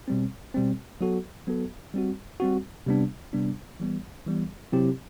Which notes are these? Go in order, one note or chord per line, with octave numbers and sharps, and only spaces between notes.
B2 G3 C4
B2 G3 C4
F#3 B3 F#4 A4
F#3 B3 F#4 A4
G3 C4 F#4
G3 C4 F#4
C3 G3 B3 D4
C3 G3 B3 D4
E3 G3 B3
E3 G3 B3
C3 F#3 C4 E4 G4